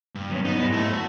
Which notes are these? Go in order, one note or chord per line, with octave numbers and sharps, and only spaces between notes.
G2
F#3 B3 C#4
B3 D#4
G#2 E4 D#5
A3 A4
F#4